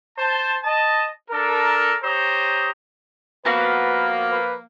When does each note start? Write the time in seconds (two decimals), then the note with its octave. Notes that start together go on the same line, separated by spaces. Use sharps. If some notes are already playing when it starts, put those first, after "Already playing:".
0.17 C5 A5
0.64 D#5 A5
1.29 D4 A4 A#4
2.03 G4 C5 C#5 A#5 D#6
3.45 F3 A#3 B3 F#4 B4 F5
4.31 B4